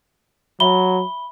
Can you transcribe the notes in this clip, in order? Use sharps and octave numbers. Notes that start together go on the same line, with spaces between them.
F#3 E5 B5 G7